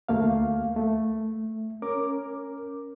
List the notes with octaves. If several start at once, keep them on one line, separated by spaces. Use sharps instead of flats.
D2 A3 A#3 F5
A3
C#4 A#4 D6